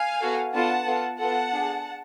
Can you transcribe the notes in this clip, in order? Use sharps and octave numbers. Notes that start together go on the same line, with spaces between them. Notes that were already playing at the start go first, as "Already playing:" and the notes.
Already playing: F5 G#5
B3 F#4 A4
B3 D4 F4 A4 F#5 A5
B3 F4 A4
B3 F4 A4 F#5 A5
D4 G#4